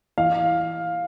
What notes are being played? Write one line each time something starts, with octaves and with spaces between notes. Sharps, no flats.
E3 F5